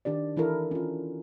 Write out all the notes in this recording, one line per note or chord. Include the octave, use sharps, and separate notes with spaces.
D#3 D4 G4 D5
E3 E4 A4 A#4
C#4 F4